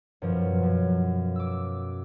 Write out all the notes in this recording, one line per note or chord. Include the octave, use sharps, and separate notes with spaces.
F#2 B2 F3
F#2
D6 E6